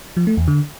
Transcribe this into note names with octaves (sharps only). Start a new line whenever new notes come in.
F3
A3
E2
D3